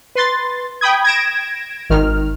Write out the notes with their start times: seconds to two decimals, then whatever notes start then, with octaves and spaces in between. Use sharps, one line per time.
0.15 B4 C6 A6
0.81 G5 B5 D#6 G#6
1.04 G#6 A#6 D7 E7
1.90 G#1 D#3 F6